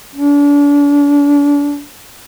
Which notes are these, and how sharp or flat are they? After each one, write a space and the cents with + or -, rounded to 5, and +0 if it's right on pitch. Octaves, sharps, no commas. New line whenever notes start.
D4 -35